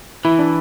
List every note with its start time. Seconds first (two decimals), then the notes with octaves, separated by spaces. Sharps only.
0.25 E3 E4
0.39 D4